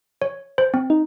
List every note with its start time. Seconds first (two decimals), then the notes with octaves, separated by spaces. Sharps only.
0.22 C#5
0.58 C5
0.74 C4
0.90 D#4